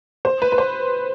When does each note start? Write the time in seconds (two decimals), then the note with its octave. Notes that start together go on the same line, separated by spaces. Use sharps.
0.25 C5
0.42 B4
0.52 B4
0.58 C5